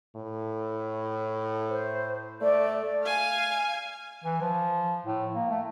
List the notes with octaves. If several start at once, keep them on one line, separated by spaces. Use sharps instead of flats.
A2
C5
A3 D5
F5 G#5
E3
F3
A2
A#3
A3